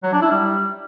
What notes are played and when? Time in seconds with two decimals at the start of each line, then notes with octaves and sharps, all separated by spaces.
0.03 F#3
0.12 D4
0.22 E4
0.31 G3